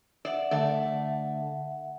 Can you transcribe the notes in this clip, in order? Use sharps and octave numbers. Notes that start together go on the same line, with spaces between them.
D5 E5 F#5
D3 A3 D5